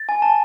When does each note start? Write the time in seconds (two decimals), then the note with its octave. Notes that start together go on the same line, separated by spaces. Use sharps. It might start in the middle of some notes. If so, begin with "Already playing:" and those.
Already playing: A6
0.09 G#5
0.22 A5